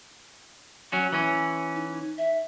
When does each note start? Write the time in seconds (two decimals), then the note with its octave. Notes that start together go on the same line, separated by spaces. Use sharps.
0.92 F#3 C#4 F#4
1.13 E3 C#4
1.75 D#4
2.18 E5